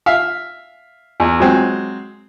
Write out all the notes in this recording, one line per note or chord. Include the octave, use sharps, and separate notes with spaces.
E5 F5
E2
F#3 G#3 C4